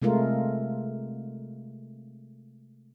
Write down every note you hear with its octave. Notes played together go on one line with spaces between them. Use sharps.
C3 G#3 A3 F4 A#4